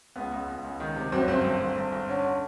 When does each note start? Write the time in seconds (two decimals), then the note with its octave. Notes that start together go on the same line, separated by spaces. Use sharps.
0.16 C#2 B3
0.32 C#2
0.48 C#2
0.64 C#2
0.80 D#3
0.96 C3
1.12 F#2 C4
1.20 C#4
1.28 G1 C4
1.44 G1
1.60 G1
1.76 G1
1.92 G1
2.09 D3 C#4
2.25 D3